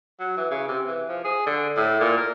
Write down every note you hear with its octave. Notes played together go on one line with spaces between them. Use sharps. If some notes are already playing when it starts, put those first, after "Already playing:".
F#3
E3
C#3
C3
E3
F3
G#4
D3
A2
A#2
A#4